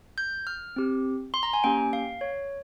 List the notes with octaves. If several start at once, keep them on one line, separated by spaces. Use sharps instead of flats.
G6
F6
C4 G4
C6
A#5
G#5
A#3 C#4 G4 G5
F5
C#5